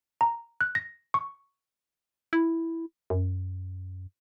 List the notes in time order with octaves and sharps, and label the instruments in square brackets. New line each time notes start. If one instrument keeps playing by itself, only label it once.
[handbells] A#5
F#6
A#6
C#6
[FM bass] E4
F#2